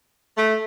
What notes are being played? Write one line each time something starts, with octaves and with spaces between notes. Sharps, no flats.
A3